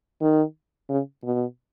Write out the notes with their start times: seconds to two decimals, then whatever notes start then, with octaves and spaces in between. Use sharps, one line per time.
0.21 D#3
0.89 C#3
1.24 B2